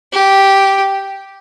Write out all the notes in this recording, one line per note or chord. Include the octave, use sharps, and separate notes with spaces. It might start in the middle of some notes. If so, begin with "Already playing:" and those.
G4